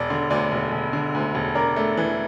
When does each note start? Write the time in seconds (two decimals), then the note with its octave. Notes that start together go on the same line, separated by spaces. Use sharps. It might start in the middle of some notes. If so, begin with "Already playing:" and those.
Already playing: E1 D5
0.10 D3
0.30 D2 D5
0.51 E1
0.72 E1
0.93 D3
1.15 D2
1.35 E1
1.55 D4 A#4
1.76 A3
1.97 E3